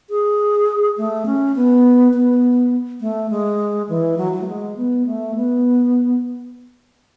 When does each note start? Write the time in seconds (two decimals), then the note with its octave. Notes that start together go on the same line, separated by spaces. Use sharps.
0.10 G#4
0.97 A3
1.26 C#4
1.56 B3
2.14 B3
3.01 A3
3.30 G#3
3.89 E3
4.18 F#3
4.32 F#3
4.41 A3
4.47 G#3
4.77 B3
5.06 A3
5.35 B3